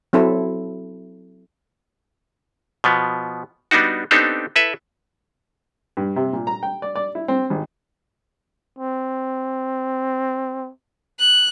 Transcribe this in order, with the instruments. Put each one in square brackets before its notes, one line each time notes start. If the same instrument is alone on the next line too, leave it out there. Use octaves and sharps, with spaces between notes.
[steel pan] F#3 C4 E4 A4
[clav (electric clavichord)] B2 F3 B3
G3 B3 D4 D#4 F#4
B3 C4 D4 D#4 G4 A4
E4 A4 B4 E5
[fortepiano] G2
C3
A#2
A#5
G5
D5
D5
E4
C4
G#1
[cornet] C4
[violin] F#6